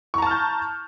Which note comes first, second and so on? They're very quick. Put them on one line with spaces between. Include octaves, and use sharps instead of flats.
C#6 A#5 A5 F6 G6